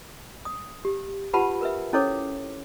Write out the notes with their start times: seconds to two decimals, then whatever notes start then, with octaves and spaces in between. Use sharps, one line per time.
0.45 D#6
0.85 G4
1.33 F4 G4 B4 F#5 A5 B5
1.61 A#4 B4 E5
1.93 C#4 E4 A4 C5 C#5 D6